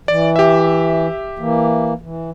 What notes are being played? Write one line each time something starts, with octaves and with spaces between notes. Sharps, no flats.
E3 D5
G4 E5
E3 A#3
E3